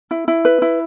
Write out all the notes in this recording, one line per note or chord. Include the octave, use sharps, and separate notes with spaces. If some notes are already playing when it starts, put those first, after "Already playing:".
E4
E4
B4
E4